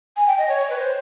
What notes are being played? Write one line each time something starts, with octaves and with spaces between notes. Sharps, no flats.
G#5
G5
D#5
C#5
B4
C5